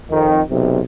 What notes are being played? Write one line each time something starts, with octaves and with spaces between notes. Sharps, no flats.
F2 D#3
B1 C3